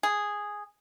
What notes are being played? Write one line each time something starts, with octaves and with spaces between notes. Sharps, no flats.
G#4